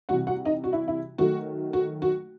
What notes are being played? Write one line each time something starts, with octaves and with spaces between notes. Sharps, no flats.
C3 E3 G3 F#4 F#5
F#4 F#5
D#4 D#5
F#4
E4
E4
D#3 F#3 A3 F#4
F#4
F#4